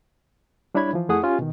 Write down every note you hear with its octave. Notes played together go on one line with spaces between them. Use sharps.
G3 D4 E4 C#5 B5 G#6
E3 F3
F2 A3 E4 G#4 F#5 D#6
C#4 F4 G4 G#5
B2 D#3